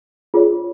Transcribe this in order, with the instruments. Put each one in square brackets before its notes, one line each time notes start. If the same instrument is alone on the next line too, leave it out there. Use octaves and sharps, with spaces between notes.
[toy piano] F4 G#4 C#5